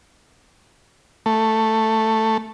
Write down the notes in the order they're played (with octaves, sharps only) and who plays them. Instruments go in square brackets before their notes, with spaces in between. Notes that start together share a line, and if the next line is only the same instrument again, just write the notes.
[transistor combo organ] A3